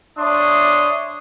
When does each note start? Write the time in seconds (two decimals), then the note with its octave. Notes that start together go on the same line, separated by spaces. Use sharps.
0.19 D4 C#5 E5 C6 D6 D#6